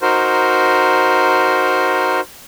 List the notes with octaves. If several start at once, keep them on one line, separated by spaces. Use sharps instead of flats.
D#4 F#4 A#4 C5